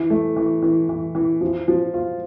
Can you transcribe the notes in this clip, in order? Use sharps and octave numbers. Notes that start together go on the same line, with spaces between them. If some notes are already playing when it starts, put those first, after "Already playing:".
Already playing: E3
A3
E3
E3
E3
E3
F3
F3
F4